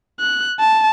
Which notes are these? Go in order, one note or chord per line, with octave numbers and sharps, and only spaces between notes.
F#6
A5